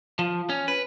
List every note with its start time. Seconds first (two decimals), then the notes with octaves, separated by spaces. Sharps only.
0.19 F3
0.49 C#4
0.68 B4